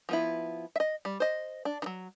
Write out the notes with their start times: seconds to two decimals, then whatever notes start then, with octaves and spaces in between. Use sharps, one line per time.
0.09 F3 B3 E4
0.76 D#5 E5
1.05 G3
1.20 C5 D#5
1.65 D4
1.82 D#3 F#3